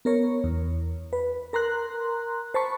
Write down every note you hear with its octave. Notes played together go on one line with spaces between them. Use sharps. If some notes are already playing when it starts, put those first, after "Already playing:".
B3 A#4 C#5
E2
B4
A#4 A#5 C6 F#6
C5 A5 B5 C#6